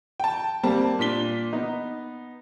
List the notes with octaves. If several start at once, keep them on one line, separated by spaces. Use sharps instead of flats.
G5 A5
G3 A#3 C4 A5
A#2 D4 B6 G7
B3 D#4